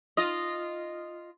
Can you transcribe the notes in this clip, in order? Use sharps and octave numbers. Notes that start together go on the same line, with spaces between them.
F4 D#5